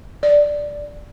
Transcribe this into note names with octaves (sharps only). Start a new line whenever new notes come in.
D5